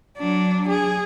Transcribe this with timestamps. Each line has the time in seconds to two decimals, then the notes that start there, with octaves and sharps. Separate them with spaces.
0.18 F#3 D4
0.69 G#4